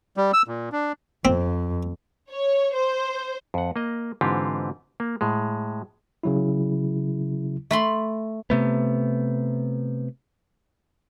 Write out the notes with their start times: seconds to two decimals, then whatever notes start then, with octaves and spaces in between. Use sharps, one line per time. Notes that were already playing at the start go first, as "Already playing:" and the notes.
0.17 G3
0.34 E6
0.48 A#2
0.72 D4
1.25 F2 C4
2.30 C#5
2.74 C5
3.54 F2 F#5
3.76 A#3 D#5
4.21 G#2 D3 E3 C4 F4 G4
5.00 A#3
5.21 A2 G#3
6.23 C#3 F#3 E4
7.71 A3 B5 C6
8.50 C3 A3 B3